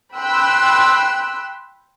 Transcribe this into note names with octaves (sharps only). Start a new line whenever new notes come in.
G5 B5 C6 E6 F#6